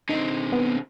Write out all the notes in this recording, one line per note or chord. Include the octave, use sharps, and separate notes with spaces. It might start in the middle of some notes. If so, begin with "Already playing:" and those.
D3 C4 D#4
B3